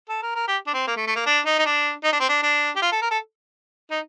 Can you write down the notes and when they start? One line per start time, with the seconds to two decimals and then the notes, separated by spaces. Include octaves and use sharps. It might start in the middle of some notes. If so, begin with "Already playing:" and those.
0.09 A4
0.22 A#4
0.35 A#4
0.48 G4
0.67 D4
0.74 C4
0.87 A#3
0.97 A3
1.07 A3
1.16 A#3
1.26 D4
1.46 D#4
1.59 D#4
1.66 D4
2.04 D#4
2.12 D4
2.20 C4
2.29 D4
2.43 D4
2.76 G4
2.82 F4
2.92 A4
3.02 A#4
3.11 A4
3.91 D#4